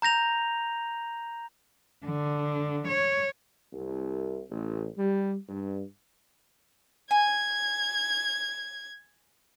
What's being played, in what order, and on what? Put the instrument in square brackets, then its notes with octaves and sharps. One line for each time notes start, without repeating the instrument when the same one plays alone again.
[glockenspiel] A#5 G6 A#6 F7
[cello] D3
C#5
[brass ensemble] C2
A1
G3
G2
[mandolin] G#5 [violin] G#6